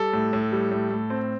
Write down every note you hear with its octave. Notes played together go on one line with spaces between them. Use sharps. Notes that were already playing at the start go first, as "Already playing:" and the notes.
Already playing: G3 A4
A2
A2
G3
A2
A2
C4